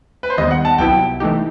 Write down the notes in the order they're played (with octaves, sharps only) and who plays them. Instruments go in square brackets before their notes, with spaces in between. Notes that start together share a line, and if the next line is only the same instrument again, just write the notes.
[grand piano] B4
C5
[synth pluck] D#2 D#3 G3 B3 [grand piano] D#5
[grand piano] F#5
A5
[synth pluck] C2 C3 F#3 B3 E4 [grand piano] G5
[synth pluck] E3 A3 D#4 G4